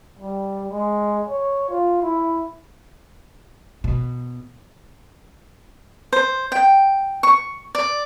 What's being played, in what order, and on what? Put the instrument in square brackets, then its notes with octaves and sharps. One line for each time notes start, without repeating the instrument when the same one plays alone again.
[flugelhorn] G3
G#3
C#5
F4
E4
[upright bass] B2
[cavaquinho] C5
G5
C#6
D5